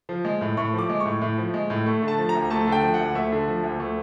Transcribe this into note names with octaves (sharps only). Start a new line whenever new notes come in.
F3
G#3
A2
A2 C#6
F3 D6
G#3
A2 C#6
A2
F3
G#3
A2
A3 C#6
D3
A5
F3
A#5
D2
A3 A5
D3
G5
F3
F#5
D2
A3 E5
D3
F3
D2
A3